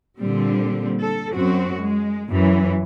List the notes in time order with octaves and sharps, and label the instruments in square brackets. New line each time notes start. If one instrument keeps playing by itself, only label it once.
[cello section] A#2 D3 G3 C4
A4
F#2 C4 F#4
G#3
F#2 E3